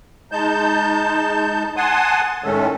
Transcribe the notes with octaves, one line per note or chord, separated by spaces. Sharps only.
G#3 D#4 A5 G6
F#5 G#5 A5 C6 D#6
A2 D#3 G#3 A3 C#4 A4